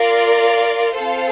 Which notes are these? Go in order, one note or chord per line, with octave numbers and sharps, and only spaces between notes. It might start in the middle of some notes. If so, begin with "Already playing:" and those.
Already playing: F4 A#4 D5 F5
C4 F4 A4 C5 F5